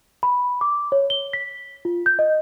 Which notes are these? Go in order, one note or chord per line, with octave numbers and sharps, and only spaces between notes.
B5
D6
C#5
G7
B6
F4
G6
D#5